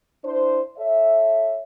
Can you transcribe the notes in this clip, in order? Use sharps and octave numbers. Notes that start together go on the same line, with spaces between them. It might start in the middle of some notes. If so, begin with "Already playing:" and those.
D4 E4 C5
A4 C#5 E5